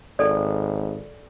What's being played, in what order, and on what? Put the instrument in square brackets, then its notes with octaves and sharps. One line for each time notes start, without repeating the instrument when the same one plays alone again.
[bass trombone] G#1 [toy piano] A4 D5